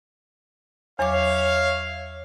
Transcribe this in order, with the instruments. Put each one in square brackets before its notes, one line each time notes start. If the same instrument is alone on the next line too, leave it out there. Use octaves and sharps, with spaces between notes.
[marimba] E2 F#3 D6 [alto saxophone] C#5 [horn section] E5 F5